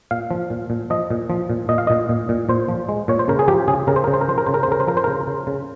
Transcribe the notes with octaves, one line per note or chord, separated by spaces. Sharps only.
A#2 F5
F3
A#2
A#2
F3 D#5
A#2
F3
A#2
A#2 D#5
F5
A#2 D#5
A#2
A#2
A#2 C5
F3
G#3
A#2 C#5
C5
C#3 A#4
G#4
F3 G4
C#3 G#4
C#3 A#4
C5
A#4
C#3
C5
A#4
F3 C5
A#4
C#3 C5
A#4
C5
C#3 A#4
C5
F3 A#4
C5
C#3 A#4
C#3
C#3